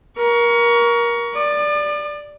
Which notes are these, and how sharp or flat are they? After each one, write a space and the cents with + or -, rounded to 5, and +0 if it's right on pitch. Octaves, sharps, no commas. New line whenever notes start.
A#4 +20 C#6 +25
D5 +0 D6 +45